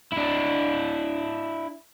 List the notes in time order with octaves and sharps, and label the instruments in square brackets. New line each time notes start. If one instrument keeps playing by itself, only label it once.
[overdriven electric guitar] D4 E4